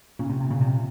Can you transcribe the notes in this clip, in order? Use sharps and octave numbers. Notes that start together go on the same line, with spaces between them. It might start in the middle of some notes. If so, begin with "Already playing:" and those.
A#2 C#3
C3
C3
A#2 C#3
C3